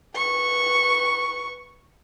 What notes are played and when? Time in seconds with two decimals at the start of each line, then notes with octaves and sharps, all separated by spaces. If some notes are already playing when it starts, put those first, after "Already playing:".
0.15 B4 C#6